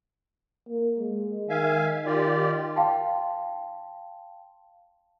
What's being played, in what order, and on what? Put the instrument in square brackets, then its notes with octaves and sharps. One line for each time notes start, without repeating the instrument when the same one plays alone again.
[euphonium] A#3
G#3
[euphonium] D#3 [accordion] E5 F5 G#5
[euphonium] D#3 [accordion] F4 G4 D5
[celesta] F5 G5 A5 C6